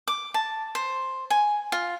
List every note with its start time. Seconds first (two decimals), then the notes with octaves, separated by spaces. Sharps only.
0.08 D6
0.34 A5
0.75 C5
1.30 G#5
1.72 F4